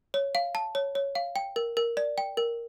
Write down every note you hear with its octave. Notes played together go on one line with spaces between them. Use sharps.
C#5
F5
A5
C#5
C#5
F5
G5
A#4
A#4
D5
G5
A#4